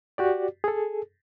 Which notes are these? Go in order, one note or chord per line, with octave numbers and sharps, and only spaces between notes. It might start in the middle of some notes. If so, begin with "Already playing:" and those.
F#4 G4 D5
G#4 A4